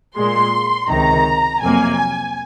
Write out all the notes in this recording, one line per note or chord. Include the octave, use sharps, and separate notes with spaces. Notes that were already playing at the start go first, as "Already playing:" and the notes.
A#2 G#3 C6
C#2 C3 D#3 A#5
F2 C3 F#3 A#3 G#5